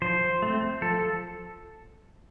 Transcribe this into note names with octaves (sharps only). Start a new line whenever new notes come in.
F3 C5
A3 C4
F3 A4